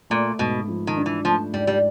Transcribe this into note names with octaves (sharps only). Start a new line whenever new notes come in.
A#2 A3
G#2 B2
F3
D#3
D4
E3
F3 A3
G#2 G3
G3